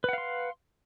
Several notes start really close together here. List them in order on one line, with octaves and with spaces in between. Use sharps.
B4 F#5 F5 C6